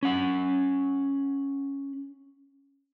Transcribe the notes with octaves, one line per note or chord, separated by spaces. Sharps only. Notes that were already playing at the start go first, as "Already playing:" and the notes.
C#4 F#5